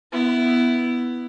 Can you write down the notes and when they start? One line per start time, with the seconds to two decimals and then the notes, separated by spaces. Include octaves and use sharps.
0.12 B3 E4